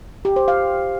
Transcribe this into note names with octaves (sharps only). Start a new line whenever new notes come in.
G4
C5
F5